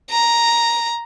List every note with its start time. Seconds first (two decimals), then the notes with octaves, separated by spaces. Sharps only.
0.11 A#5